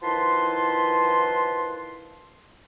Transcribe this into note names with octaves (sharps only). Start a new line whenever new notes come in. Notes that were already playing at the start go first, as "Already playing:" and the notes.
D#3 F3 E4 B4 A5 C6